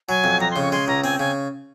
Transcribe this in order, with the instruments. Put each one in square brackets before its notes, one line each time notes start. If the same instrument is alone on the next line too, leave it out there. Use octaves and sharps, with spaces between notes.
[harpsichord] F#3 [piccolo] G#5
[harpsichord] F2
[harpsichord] F2 [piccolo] A#5
[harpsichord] C#3 [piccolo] C6
[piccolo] C#6
[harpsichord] G#3 [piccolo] C6
[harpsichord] C#2 [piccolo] A#5
[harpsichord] C4 [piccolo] G#5
[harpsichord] C#3 [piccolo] G#5